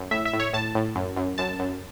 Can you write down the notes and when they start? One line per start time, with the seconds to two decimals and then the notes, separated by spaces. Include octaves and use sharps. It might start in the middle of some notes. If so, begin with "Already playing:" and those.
Already playing: F#2
0.11 A2 E5
0.25 E5
0.33 A2
0.40 C#5
0.53 A2 A5
0.75 A2
0.95 F#2
1.16 F#2
1.38 F#2 A5
1.59 F#2